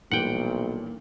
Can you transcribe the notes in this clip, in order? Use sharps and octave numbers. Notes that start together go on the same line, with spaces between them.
B1 A#2 E3 G3 A#3 D4 F#5 G5